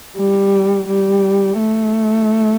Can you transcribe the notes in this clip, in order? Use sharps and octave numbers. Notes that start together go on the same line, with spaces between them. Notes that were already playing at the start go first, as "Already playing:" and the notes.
G3
G3
A3